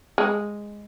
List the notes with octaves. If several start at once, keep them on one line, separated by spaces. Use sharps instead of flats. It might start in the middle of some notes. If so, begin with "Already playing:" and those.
G#3